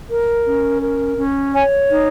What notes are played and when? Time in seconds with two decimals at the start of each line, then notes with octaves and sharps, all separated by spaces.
0.09 A#4
0.46 C#4
0.82 A#4
1.18 C#4
1.54 C#5 G#5
1.90 D#4